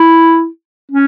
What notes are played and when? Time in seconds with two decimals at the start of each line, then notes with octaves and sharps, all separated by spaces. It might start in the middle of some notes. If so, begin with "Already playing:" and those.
Already playing: E4
0.92 C#4